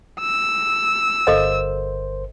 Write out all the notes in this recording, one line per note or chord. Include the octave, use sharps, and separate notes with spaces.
E6
G1 A4 A#4 C5 D#5 F5